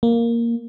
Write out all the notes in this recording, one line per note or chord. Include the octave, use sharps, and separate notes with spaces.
A#3